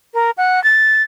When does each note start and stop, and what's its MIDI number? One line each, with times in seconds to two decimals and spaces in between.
0.14 0.31 70
0.37 0.62 78
0.64 1.02 93